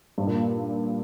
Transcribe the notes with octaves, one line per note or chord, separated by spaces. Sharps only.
G2
A#2